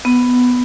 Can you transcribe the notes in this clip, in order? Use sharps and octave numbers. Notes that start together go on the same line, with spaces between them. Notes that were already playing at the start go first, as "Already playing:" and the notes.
B3